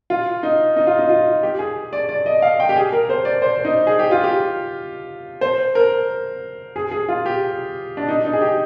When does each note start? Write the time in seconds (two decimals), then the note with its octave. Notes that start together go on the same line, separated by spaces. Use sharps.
0.10 F4
0.43 D#4
0.77 D#4
0.87 F4
0.99 D#4
1.09 F4
1.43 G4
1.59 G#4
1.93 D5
2.09 D5
2.26 D#5
2.42 F5
2.60 G5
2.69 G4
2.76 G#4
2.92 A#4
3.10 C5
3.25 D5
3.42 C5
3.65 D#4
3.87 G#4
3.99 G4
4.11 F4
4.24 G4
5.41 C5
5.75 A#4
6.76 G#4
6.91 G#4
7.09 F4
7.26 G4
7.97 D4
8.08 D#4
8.25 D#4
8.33 G#4
8.41 G4